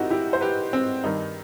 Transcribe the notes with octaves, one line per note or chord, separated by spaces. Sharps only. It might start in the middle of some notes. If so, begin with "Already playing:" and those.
Already playing: D#3 C4 D#4 E4 F#4 G4
E4 G4
C5
G4 B4
C4
G2 D#3 D#4